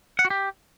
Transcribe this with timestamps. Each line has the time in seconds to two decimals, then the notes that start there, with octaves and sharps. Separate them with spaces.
0.19 F#5
0.25 F#4
0.30 G4